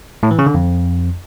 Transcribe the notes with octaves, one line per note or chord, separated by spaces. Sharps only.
A2
E3
C#3
D3
F2